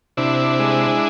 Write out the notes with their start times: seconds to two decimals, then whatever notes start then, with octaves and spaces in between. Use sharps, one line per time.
0.17 C3 D4 E4
0.60 G#3